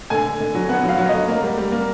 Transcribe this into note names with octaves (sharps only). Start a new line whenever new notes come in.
D3 G#5
D3
D3
F#3
B3 F#5
F#3
F5
F#3
D3 D#5
A#3
G3
G3
A#3